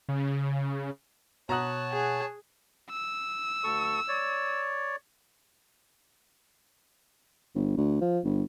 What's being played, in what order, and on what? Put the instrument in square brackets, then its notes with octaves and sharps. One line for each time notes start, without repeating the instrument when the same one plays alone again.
[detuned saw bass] C#3
[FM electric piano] B2 F#5 F#6 [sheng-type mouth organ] C#5 A5 [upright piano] A#5 D#6
[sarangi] G#4
[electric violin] E6
[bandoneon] D2 A4 C#6
C#5 D5
[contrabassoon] G1
D2
F3
G1